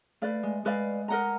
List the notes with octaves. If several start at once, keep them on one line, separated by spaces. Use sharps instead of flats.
A3 B4 D5 F5
G#3
G#3 B4 D5 F5
A#4 D#5 F#5 A#5